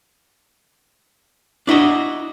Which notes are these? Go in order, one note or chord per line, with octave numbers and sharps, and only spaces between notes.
D4 E4 F#4 D#5